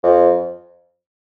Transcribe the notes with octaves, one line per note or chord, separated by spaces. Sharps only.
F2